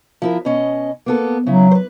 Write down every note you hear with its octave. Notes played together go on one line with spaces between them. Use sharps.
F3 E4 A#4
B2 C#4 D#5
A#3 B3 A4
C#3 F#3 E4
B4 C5